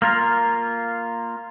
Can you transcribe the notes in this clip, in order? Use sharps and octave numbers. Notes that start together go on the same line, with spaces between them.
A#3 F4 A#4